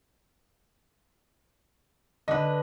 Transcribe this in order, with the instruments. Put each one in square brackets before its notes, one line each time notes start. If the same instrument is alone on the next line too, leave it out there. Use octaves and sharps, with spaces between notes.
[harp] D3 B4 [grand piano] D#5